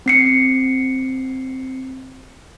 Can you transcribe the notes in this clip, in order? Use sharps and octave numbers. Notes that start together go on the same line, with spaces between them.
C4 C7 C#7